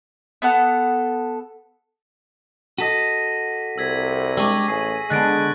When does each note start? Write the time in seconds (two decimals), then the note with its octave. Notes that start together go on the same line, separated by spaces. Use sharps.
0.42 B3 A4 F#5
2.78 F#4 A4 D#5 A#6 B6 D#7
3.78 C2 E6 G#6 B6
4.37 G3 G#3 D4 C#6 E6
4.68 A1 G#4
5.10 D3 G#3 B3 F#6 A6 D7